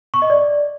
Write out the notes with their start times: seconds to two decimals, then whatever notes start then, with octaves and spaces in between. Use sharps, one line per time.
0.14 C#6
0.22 D#5
0.30 D5